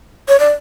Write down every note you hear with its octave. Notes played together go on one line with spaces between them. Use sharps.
C#5
D5